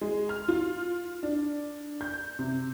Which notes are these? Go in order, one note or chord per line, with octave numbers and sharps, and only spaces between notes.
G#3
F6
F4
D4
G6
C3